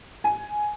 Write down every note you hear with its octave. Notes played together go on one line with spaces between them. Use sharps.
G#5